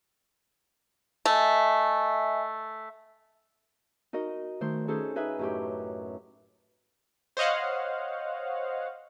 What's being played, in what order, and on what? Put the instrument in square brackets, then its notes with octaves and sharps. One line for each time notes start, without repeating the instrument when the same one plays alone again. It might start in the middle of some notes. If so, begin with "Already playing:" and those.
[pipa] A3 [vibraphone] D#5 E5 G#5
[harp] D#4 F#4 A#4 D#5
D#3 A3 C5
C#4 D#4 G#4 A4 C5
D#4 G#4 B4 D#5 E5
F#2 A2 G4
[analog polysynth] C5 C#5 D#5 F5 F#5